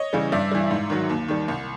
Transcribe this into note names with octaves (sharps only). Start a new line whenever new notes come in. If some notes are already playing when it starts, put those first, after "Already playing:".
Already playing: C#5 D#5
C#3 E3 G3
G2 D5 E5
E3 G3
G#2
D#3 F#3
D#2
D#3 G3
C2